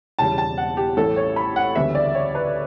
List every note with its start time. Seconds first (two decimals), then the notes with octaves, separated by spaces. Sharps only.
0.19 E1 E2 C#3 G3 A5
0.38 A5
0.58 F#5
0.77 G4
0.97 A1 A2 G3 C#4 A4
1.16 C#5
1.36 B5
1.56 F#5
1.75 D2 C#3 E3 G3 B3 E5
1.95 D5
2.14 C#5
2.35 B4